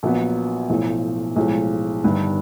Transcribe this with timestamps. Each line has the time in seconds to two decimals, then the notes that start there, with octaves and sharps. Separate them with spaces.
0.03 A#1 A#2 F#3 B3
0.69 B1 A2 F3
1.36 B1 A2 F3 G#3
2.04 G1 G2 D#3